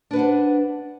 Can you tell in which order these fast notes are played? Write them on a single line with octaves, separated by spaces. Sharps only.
D4 B4 F#5 C5